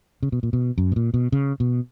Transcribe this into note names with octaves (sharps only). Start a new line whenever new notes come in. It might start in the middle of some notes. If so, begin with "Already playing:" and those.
C#3
B2
A#2
B2
F#2
B2
A#2
B2
C#3
B2